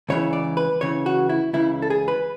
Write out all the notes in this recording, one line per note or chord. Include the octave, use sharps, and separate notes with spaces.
C#2 C#3 E3 C#5
D5
B4
C#2 C#3 E3 C#5
F#4
E4
C#2 C#3 E3 E4
A4
G#4
B4